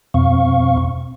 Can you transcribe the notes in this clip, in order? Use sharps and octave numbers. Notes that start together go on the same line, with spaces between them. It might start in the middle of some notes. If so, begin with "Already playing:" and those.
F2 B2 C4 F5 C#6